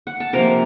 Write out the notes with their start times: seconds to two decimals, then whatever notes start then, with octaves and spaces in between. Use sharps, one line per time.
0.07 F#5
0.20 A5
0.33 C3 F3 A#3 A#4 A#5